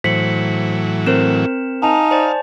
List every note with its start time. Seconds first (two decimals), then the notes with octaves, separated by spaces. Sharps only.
0.04 A2 E3 F#3 C5 B6 C#7 F#7
1.06 C4 A#4 C5 E7
1.82 D#4 F5 G#5 A5 F7
2.11 C5 D5